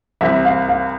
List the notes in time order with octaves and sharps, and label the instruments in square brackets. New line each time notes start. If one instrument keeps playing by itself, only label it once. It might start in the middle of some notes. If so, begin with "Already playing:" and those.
[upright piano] C2 C3 E3 G3 [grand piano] E5
[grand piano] F5
F5